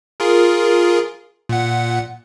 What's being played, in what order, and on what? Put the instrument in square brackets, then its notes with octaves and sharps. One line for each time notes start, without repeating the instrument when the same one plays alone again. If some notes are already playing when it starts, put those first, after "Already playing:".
[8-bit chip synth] F4 G#4 A#4
A#2 F#5